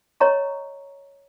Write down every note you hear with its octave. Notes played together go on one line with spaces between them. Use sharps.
C#5 D#5 A#5 C#6